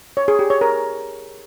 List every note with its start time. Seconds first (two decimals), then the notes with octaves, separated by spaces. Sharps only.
0.17 C#5
0.28 G#4
0.39 G4
0.50 C#5
0.61 A#4